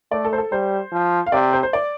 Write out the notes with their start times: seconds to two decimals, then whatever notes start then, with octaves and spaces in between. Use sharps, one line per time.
0.12 A3 D5
0.25 A4
0.33 C5
0.38 A4
0.52 G3 C5
0.92 F3
1.26 F5
1.32 C3 D5
1.53 C5
1.63 C5
1.73 D5